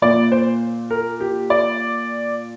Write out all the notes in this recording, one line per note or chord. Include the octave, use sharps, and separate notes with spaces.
A#2 A#3 D5
C5
A#4
G4
D5